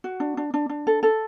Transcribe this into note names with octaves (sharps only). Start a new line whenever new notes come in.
F#4
D4
D4
D4
D4
A4
A4